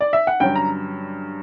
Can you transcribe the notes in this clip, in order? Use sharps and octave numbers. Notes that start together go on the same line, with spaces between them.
D5
E5
F#5
G2 D3 F#3 C#4 G5
A#5